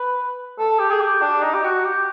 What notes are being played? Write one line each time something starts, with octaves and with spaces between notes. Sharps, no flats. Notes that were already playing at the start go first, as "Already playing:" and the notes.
Already playing: B4
A4
G4
G#4
G4
D4
D#4
G4
F#4
G4